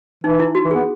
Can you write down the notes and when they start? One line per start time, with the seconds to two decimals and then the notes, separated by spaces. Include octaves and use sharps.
0.24 E3 D#4
0.40 E4
0.55 F#4
0.65 E3
0.71 B3 G#4